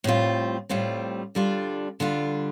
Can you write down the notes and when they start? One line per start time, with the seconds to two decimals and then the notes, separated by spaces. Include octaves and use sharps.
0.04 A2 G3 C4 F4
0.69 A2 G3 C4 F4
1.35 D3 G3 D4 F4
2.00 D3 G3 D4 F4